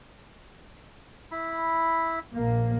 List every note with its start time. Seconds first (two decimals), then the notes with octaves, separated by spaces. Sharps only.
1.31 E4 B5
2.34 A#1 A#3